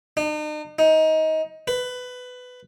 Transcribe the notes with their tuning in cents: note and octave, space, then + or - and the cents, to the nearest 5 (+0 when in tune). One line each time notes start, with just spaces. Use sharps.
D#4 -45
D#4 +20
B4 +15